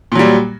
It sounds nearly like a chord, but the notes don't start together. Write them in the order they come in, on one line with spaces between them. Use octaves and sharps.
A#2 F#3 G3